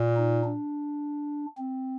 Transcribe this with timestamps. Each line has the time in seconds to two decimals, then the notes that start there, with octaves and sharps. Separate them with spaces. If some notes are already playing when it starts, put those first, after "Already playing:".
Already playing: A#2
0.17 D#4
0.44 D4
1.58 C4